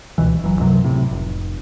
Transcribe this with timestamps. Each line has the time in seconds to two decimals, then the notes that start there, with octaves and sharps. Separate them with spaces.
0.18 D#1 C#2 B2 E3
0.42 F#1 E3 F#3
0.59 C#2 F#2 C3 F#3
0.84 A2 C3
1.11 F1